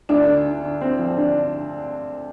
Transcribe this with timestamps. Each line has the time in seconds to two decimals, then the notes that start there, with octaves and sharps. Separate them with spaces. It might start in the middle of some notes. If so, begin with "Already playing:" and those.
0.09 D2 D3 D4
0.27 D3
0.46 D3
0.63 D3
0.81 D3 C4
0.99 F3
1.17 D3 D4